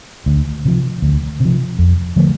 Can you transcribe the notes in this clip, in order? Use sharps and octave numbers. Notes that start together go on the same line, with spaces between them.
D2
C3 F3
D2
C3
F3
F2
D3 F3 A3